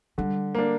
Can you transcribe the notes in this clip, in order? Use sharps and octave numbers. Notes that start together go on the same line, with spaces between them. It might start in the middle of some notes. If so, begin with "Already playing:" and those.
D3 G3
A#3 D4